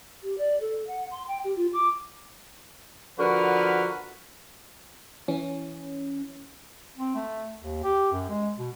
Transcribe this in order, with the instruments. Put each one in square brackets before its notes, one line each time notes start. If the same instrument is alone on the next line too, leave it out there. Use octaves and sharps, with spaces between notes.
[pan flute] G4
D5
A4
F#5
C6
G5
G4
F4
D6
[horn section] D3 F3 F#4 A#4 B4
[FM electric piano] E3 C#4
[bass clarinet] C4
A3
D#2
G4
F#2
G#3
B2